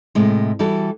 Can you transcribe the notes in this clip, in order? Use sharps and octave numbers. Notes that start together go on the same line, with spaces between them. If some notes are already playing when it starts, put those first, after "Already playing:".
A2 C3 G#3
E3 G3 E4 F#4 A4